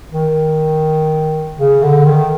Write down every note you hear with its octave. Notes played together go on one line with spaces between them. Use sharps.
D#3
C#3
D3
D#3